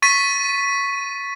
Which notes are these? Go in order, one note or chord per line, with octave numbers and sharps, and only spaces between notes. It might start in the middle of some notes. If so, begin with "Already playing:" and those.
C#6 A6 B6 D#7